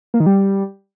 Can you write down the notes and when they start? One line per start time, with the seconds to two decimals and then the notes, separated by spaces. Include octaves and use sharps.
0.14 A#3
0.20 D#3
0.26 G3